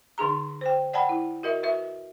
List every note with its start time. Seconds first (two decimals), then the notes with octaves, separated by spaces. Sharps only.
0.18 D3 D#4 G#4 A#5
0.61 C5 G5
0.93 D5 F#5 G5 A5 B5
1.09 E4
1.43 F#4 A#4 D#5 E5
1.63 F#4 B4 E5